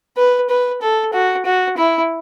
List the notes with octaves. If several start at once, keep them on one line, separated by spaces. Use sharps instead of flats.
B4
B4
A4
F#4
F#4
E4